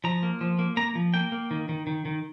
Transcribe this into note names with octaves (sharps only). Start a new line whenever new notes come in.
F3 A#5
A#3
F3
A#3
A#3 A#5
F3
A#3 G5
A#3
D#3
D#3
D#3
D#3